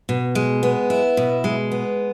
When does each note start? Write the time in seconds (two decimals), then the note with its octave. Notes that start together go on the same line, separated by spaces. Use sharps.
0.09 B2
0.35 G#3
0.63 B3
0.90 E4
1.17 B2
1.44 G#3
1.71 B3